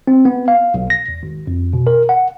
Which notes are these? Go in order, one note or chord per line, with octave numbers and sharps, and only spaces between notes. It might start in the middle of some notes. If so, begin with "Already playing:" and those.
C4
B3
F5
B1
A#6
E2
G#1
F2
B2
A#4
F#5